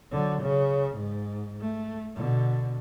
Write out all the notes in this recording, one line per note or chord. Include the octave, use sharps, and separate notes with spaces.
D3 F#3
C#3
G#2
A3
B2 D3